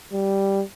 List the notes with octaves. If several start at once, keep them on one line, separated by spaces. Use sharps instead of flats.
G3